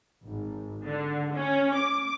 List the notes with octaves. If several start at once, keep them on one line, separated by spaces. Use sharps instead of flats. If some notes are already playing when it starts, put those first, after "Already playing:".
G#1
D3
C#4
D6